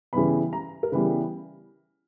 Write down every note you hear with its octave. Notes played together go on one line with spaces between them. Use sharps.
C#3 E3 G3 B3 B5
A#5
A#4
C#3 E3 G3 B3 B4